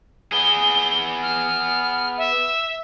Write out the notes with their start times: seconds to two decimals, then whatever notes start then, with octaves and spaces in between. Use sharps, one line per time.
0.32 B3 G#4 G7
1.22 F6
2.17 E5